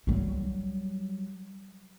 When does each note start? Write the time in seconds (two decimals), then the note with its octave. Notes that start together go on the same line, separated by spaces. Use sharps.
0.07 F#3 G3